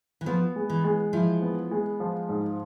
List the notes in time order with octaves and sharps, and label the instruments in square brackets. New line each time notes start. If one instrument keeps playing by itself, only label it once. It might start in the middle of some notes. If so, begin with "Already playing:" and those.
[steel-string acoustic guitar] E3
[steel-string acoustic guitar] F3 [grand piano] B3
[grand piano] G#3
[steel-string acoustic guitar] E3
[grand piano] G#3
[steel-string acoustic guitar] F3 [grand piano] E4
[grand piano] B3
G#3
F3
G#2